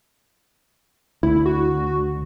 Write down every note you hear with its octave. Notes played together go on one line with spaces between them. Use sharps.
D2 E4
F#4